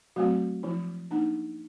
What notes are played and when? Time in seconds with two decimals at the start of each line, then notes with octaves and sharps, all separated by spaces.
0.16 F#3 A3 C4 F#4
0.63 F3 E4
1.11 A#3 D4 D#4